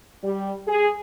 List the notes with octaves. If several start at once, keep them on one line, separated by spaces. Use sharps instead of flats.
G3
G#4